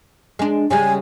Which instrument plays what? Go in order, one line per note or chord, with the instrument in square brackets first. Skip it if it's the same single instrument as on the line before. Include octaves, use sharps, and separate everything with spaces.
[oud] G#3 D4
[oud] C#3 G3 G#3 [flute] G#5